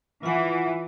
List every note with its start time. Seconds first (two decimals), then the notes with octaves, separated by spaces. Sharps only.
0.23 E3 F4 F#5